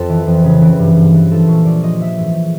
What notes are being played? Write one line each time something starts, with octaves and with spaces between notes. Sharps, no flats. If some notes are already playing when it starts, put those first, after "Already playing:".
Already playing: F2 A4
E3
F2
C#3
E3
G2
G2
E3
F3 A4
A#2 C#5
A#2 D5
F3 D#5
E3 E5
G#2